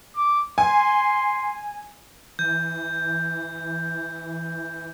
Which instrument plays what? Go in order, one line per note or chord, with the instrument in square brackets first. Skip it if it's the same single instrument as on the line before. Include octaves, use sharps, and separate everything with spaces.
[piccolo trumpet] D6
[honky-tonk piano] G#5 [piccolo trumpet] C6
[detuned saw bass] E3 [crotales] G6